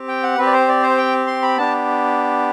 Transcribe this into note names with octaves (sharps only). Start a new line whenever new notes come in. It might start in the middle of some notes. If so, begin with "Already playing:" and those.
Already playing: C4 G4
G5
F#5
C4 G4 B4
D5
C5
D5
C5
G5
C6
B5
B3 D4 G4 A5